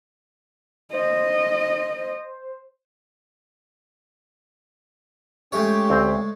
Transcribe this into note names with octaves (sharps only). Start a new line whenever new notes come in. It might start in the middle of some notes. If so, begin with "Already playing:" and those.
C5 D#5
G#3 A3 C#4 G4 C#5
D2 C4